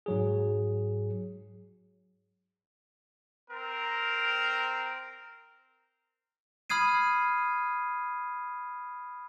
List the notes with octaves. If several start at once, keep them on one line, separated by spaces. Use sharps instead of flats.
G#2 F#3 G#4
C4 A#4
B5 D#6 F6 G#6 C7 D#7